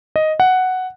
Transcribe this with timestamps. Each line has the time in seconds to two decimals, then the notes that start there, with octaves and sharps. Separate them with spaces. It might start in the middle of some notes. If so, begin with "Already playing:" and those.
0.16 D#5
0.40 F#5